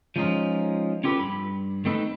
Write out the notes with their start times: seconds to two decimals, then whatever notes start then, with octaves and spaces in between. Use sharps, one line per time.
0.16 F3 G#3 C#4 D#4 F4
1.04 C#4 F4 G4 A4 B4
1.19 G2 B5
1.85 A3 C4 D#4 A4 B4